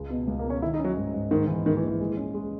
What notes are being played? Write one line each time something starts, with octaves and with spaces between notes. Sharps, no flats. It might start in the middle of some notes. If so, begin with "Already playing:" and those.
Already playing: C#2 G#3
B2
C#2 G#3
A#3
B2
C#4
D#3 E4
D#4
F#3 C#4
G#2
G#2
G#2 D#3
E3
G#2 D#3
E3
A#1
E3
G#3
C#4
G#3